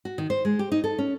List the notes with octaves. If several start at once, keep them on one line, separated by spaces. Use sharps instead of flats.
F#4
D#3
C5
G#3
G4
D#4
A4
C#4